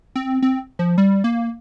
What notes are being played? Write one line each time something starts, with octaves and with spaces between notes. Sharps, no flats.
C4
C4
F3
G3
A#3